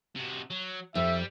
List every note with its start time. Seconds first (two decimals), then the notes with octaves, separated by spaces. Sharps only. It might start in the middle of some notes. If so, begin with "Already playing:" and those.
0.16 C3 F#4
0.50 F#3
0.95 F2 G3 E5